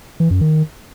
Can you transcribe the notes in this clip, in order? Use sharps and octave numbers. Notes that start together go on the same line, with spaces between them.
E3
F#2
D#3